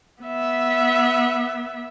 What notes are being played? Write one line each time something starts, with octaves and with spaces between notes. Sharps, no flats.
B3 E5